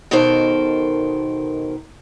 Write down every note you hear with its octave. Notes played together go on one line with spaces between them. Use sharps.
B2 D#3 A4 A#4 C5